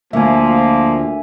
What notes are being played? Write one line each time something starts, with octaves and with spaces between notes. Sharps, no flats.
D2 F3 A#3 E5 G#5